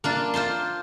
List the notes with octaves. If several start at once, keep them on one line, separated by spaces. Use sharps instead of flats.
A#3 D4 F4
F4 C5 A5 C6